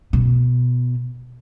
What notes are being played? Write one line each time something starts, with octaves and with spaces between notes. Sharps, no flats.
B2